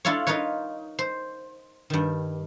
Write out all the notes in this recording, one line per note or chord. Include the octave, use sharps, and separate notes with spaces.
D4 E4 F4 A4 C#5
D#4 F4 A#4 B4 C#5
C5
G2 D#3